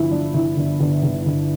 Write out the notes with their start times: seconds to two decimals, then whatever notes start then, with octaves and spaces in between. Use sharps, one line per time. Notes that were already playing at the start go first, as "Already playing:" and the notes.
Already playing: G1 F3 E4
0.11 F3 D4
0.34 G1 E4
0.57 G1
0.80 G1
1.03 G1
1.26 G1